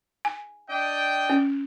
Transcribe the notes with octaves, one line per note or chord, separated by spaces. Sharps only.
G#5
D4 D#5 G5
C#4